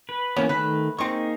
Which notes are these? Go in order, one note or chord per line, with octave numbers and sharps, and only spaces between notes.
B4
E3 A#3 B3 C#4
D#3 A3 B4
A#3 C4 D#4 G#4 C#6